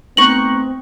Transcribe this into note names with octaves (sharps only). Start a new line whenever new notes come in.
A3 B3 C4 D#4 C#6 F#6 F#7